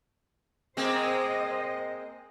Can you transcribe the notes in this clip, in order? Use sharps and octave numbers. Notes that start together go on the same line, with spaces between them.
G#3 A#3 C4 C5 D#5